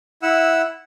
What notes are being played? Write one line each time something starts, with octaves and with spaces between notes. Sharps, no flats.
E4 F#5 E6